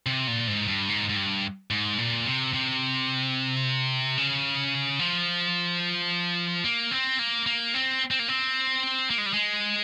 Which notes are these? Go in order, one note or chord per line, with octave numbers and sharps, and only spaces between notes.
C3
A#2
G#2
G2
G#2
G#2
G2
G#2
A#2
C3
C3
C#3
F3
A#3
C4
A#3
A#3
C4
C4
A#3
C4
A#3
G#3
G3
G#3